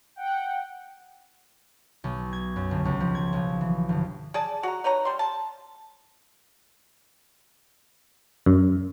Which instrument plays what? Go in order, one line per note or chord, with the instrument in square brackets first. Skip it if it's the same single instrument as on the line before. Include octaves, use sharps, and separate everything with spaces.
[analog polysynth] F#5 G5
[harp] B1
G#6
F#2
G1
C#2
F3
G#6
B1
E3
G1
[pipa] G#4 D5 A5
F#4 A#5
D#4 B4 C#5 A#5
G3 C6
A5
[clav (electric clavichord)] F#2